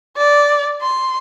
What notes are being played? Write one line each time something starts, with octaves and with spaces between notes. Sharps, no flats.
D5
C6